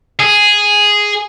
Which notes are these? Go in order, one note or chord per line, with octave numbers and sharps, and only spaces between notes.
G#4